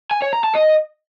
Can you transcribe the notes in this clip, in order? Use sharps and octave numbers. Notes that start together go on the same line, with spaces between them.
G#5
C#5
A#5
A5
D#5